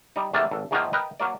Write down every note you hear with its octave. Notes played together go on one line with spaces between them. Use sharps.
G3 D#4
E2 C3 A3 A#3 A5
G#1 A4
E2 G#2 D#3 F3 G#3 A#3
A#4 B4 D#5 G5
F#3 A#3 D5